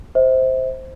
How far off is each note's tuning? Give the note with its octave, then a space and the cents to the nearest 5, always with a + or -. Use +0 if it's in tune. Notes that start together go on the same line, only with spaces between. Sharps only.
C5 +0 E5 -40